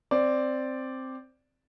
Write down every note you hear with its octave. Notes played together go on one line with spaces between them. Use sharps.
C4 D5